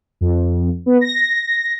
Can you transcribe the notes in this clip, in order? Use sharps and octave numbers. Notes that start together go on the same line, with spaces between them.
F2
B3
A#6